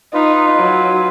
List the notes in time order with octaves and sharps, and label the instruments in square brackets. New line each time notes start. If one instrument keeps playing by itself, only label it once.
[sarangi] D#4 [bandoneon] F4 B4
[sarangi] F#3